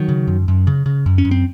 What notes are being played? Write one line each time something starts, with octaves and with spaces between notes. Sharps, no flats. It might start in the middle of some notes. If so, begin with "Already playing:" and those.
Already playing: D#3 F#3
C#3
F#2
F#2
C#3
C#3
F#2
C#4
F#2
C4